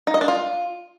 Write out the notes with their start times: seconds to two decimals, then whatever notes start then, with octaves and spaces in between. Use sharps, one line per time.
0.07 D#4
0.14 D#5
0.21 D4
0.28 F4